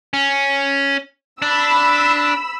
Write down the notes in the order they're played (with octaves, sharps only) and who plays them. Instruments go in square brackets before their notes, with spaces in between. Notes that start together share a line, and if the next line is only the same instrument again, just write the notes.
[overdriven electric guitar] C#4
[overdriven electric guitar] D4 [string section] B5 E6